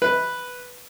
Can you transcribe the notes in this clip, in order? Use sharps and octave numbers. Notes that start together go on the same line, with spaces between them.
B4